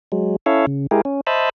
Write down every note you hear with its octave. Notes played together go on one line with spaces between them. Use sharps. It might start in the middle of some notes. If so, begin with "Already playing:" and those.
F#3 G#3
C#4 E4 A4 C#5 E5 F5
C#3
G#3 E4 G4 G#4 A#4
C#4
C5 D#5 E5 A5 B5